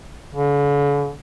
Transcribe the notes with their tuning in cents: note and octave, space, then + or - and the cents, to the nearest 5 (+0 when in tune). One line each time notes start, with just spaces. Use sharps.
D3 -45